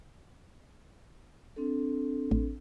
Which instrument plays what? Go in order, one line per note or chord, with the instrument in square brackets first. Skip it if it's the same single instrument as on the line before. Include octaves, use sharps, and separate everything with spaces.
[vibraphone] C4 D4 A4
[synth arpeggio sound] A1